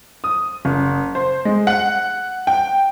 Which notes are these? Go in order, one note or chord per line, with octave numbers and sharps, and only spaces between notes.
D#6
F#1
C5
G#3
F#5
G5